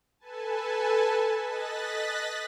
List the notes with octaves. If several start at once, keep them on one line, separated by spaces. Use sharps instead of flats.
A4 B4 G#5 A5
D#5 F#6 A6 B6